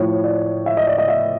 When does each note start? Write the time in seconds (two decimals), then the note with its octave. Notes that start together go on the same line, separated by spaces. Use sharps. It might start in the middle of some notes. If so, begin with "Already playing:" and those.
Already playing: A2 F3 C#5
0.24 D5
0.66 E5
0.77 D#5
0.87 D5
0.98 D#5
1.08 E5